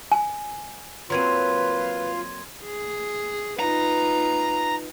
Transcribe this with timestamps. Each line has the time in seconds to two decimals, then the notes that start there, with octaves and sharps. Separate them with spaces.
0.12 G#5
1.10 F#3 A#3 C4 F4 B4 C6 G#6 D#7
2.64 G#4
3.60 D#4 F4 B4 A#5